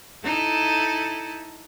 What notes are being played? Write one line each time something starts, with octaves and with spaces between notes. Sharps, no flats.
D#4 E4 A4